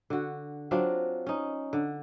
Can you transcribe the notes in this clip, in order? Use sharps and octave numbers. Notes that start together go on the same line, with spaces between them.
D3 F#4
F#3 C4 D4 F4
C#4 D#4
D3